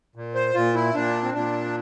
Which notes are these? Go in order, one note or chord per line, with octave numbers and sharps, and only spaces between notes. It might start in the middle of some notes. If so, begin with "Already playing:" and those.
A#2
C5
A#2 F4
E4
A#2 D4
C4
A#2 D4